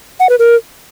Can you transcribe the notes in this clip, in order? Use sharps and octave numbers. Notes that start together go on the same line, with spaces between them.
F#5
B4
A#4